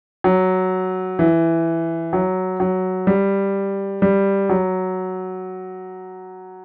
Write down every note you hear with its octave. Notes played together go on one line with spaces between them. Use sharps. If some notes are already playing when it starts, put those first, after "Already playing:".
F#3
E3
F#3
F#3
G3
G3
F#3